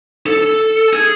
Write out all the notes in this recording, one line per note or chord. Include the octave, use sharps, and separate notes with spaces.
A4
G#4